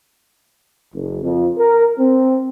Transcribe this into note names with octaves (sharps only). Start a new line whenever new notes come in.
F#1
F2
A#4
C4